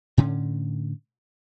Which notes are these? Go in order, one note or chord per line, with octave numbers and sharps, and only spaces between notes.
A2 D3 C#4